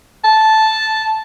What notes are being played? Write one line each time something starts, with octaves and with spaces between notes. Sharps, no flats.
A5